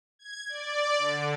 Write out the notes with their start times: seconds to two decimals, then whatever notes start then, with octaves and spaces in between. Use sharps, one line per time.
0.19 G#6
0.49 D5
0.98 D3